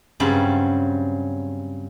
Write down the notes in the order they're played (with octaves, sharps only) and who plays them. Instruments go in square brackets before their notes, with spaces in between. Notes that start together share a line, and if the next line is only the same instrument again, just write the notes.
[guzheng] G2 C#3 F#3 C4 A5 B5